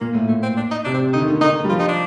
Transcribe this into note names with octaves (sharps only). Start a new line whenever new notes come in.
A#2 A#3
A2
A#2 A3
C4
D4
D#4
C3 D4
C4
D3 D#4
D#3
D3
D3 D#4
G3
F3 F4
D#4
D4